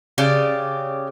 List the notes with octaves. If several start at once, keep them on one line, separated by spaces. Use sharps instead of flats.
C#3 G4 D5